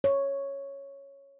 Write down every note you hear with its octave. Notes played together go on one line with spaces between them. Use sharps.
C#5